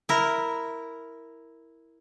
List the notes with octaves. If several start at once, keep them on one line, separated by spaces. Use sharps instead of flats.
E4 A#4